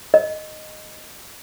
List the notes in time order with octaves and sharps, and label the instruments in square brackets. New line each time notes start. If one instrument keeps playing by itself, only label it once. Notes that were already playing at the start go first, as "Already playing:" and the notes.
[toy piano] D#5